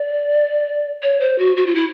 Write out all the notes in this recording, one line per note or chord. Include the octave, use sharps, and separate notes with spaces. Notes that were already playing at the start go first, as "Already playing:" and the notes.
Already playing: D5
C#5
C5
F#4
F#4
F4
E4